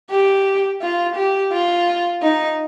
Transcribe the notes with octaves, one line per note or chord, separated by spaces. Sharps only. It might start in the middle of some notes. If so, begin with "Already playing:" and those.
G4
F4
G4
F4
D#4